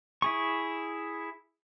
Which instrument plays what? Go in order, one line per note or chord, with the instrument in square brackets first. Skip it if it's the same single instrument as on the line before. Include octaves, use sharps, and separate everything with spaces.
[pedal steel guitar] E4 G#4 C#6